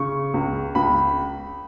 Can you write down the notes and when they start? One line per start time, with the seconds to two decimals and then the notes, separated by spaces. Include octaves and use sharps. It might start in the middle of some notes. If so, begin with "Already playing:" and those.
Already playing: C#3 C#6
0.34 C#2
0.75 C#2 B5